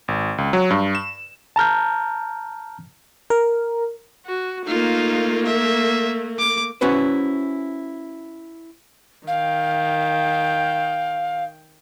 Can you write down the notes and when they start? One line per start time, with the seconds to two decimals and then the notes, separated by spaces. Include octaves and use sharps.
0.08 G#1
0.38 C#2
0.53 F#3
0.70 G2
0.95 E7
1.56 A5 A#5 F6 G6
3.30 A#4
4.26 F#4
4.67 A3 A#3 D#4 F4
5.46 E5
6.39 D6
6.81 C#4 E4 F#4 B4 C5
9.27 D#3 F5 G5